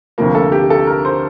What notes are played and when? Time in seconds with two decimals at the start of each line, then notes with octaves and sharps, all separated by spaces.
0.18 D2 C3 F3 A#3
0.35 A4
0.52 G4
0.70 A4
0.87 A#4
1.05 C5